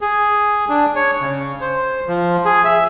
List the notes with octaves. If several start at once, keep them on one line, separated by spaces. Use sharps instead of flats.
G#4
D4
C#5
C#3
C5
F3
G#4
E5